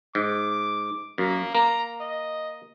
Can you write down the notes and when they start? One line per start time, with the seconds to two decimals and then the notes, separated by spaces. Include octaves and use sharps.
0.15 G#2 D6
1.18 F#2 A#3
1.55 A#3 A#5
2.00 D#5